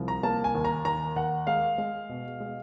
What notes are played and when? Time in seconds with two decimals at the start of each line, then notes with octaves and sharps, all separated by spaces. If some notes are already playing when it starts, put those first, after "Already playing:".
Already playing: C2 F3
0.08 A#5
0.23 A#3 A5
0.44 G#5
0.55 D#2
0.65 A#5
0.85 D#2 A#5
1.16 D#2 F#5
1.47 G#3 F5
1.78 G#3
2.09 B2
2.40 G#3